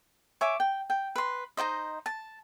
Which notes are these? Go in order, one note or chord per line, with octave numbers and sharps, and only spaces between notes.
C#5 E5 G#5 D6
G5
G5
B4 C6
D#4 F#4 C5 D#5
A5